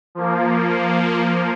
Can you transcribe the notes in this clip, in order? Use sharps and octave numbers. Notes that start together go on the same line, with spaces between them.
F3 A#3